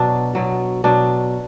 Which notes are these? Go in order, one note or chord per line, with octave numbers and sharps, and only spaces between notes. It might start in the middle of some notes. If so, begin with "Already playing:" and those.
Already playing: B2 F#3 D4
B2 F#3
B2 F#3 D4